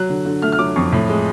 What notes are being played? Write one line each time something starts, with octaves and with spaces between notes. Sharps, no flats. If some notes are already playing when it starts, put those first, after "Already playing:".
Already playing: F#3 F#6
D3
D3
A3 F6
F6
F#3 D6
F2 C#6
A2
G#3